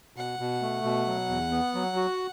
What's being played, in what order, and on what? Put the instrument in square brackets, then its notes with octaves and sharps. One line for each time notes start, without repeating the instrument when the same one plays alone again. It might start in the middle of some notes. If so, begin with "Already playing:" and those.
[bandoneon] B2 [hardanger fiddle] F#5
[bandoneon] B2
A3
B2
F#3
E2
B3
F#3
F#4